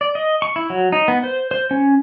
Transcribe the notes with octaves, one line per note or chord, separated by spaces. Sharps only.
D5
D#5
C#6
E4
F#3
D#4
B3
C5
C5
C#4